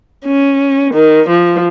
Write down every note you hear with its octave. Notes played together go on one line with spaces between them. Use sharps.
C#4
D#3
F3